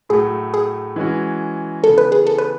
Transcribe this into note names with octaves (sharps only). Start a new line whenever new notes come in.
A2 F#3 A3 G#4
G#4
E3 G#3 C#4 F#4
C#3 E3 B3 A4
B4
G#4
A4
B4